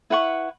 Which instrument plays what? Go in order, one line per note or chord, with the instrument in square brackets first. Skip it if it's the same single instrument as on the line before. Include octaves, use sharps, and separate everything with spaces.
[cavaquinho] E4 B4 F#5 C#6